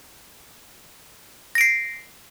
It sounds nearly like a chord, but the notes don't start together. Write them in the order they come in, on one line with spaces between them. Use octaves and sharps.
A#6 D7 C7